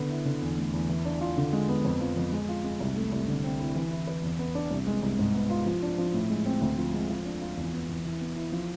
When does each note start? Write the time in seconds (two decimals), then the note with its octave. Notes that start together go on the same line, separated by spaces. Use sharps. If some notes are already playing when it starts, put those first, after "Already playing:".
Already playing: D3 B3
0.09 E4
0.26 D3
0.42 E2
0.58 A3
0.73 E2
0.89 E3
1.05 D4
1.21 F4
1.37 D3
1.53 G#3
1.69 B3
1.85 F2
2.00 F3
2.17 F2
2.32 G#3
2.49 F4
2.64 G#3
2.80 C2
2.96 A3
3.12 C2
3.28 D3
3.44 C4
3.59 E4
3.76 E3
3.91 E4
4.07 B4
4.23 E2
4.39 B3
4.55 D4
4.71 C2
4.87 G#3
5.03 C2
5.19 G#2
5.35 B3
5.50 F4
5.66 F3
5.82 D4
5.98 F3
6.14 A2
6.30 G#3
6.46 C4
6.61 D2
6.77 F3
6.94 G#3
7.09 F3
7.25 D4
7.41 F4
7.57 E2
7.73 B3
7.89 E2
8.05 E3
8.21 B3
8.36 E4
8.52 F3